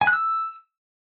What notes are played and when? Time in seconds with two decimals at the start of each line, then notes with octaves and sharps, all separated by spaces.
0.01 G#5
0.07 F#6
0.13 E6